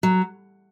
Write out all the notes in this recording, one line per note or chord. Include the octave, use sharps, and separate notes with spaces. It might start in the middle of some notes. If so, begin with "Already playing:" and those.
F#3